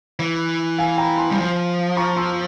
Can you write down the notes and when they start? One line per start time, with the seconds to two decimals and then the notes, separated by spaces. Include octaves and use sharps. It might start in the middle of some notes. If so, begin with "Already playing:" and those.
0.19 E3
0.78 F5 G#5
0.98 G5 A#5
1.18 G#5 C6
1.31 G3
1.38 F3
1.97 A#5 C#6
2.17 C6 E6